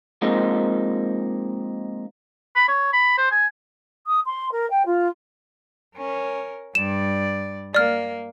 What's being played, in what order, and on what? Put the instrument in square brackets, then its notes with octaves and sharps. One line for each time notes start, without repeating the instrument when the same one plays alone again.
[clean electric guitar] F3 G#3 A#3 C4 D#4
[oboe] B5
C#5
B5
C5
G#5
[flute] D#6
C6
A#4
G5
F4
[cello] C#4 A#4
[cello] G2 D5 [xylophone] E7
[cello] A#3 [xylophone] D5 F6